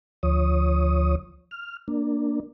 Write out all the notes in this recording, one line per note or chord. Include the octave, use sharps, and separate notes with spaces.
D2 F3 C#5 D#6
F6
A#3 D4